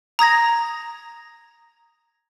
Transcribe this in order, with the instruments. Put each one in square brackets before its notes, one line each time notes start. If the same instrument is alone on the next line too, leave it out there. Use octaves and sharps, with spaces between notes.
[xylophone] A#5 D#6 G#6 A#6